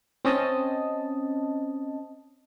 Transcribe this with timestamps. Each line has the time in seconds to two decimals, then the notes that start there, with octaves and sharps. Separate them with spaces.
0.25 C4 C#4 D#5 A5